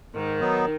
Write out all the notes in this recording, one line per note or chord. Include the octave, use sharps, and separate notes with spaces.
G#2 D#3
F#3 B3 D#4